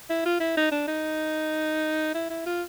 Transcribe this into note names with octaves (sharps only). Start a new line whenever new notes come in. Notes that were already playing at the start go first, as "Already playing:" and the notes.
E4
F4
E4
D#4
D4
D#4
E4
E4
F4